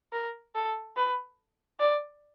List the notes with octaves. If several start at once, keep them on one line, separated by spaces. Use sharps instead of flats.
A#4
A4
B4
D5